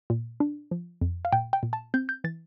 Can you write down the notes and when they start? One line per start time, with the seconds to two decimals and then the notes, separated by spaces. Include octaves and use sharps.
0.10 A#2
0.40 D4
0.71 F3
1.01 F2
1.25 F5
1.32 A#2 G5
1.53 G5
1.63 A#2
1.73 A5
1.94 C4 G6
2.09 G6
2.24 E3 A6